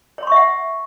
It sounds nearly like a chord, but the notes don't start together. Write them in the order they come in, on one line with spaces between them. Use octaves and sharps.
C#5 C6 C#6 E5 F#5